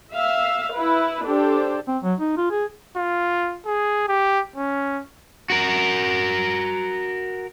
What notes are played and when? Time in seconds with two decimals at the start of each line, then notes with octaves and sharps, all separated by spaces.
0.14 E5 F5
0.73 E4 B4
1.24 D4 G4 A4 C5
1.88 C4
2.03 F#3
2.20 D#4
2.37 F4
2.51 G#4
2.96 F4
3.66 G#4
4.09 G4
4.56 C#4
5.50 F#4 A#4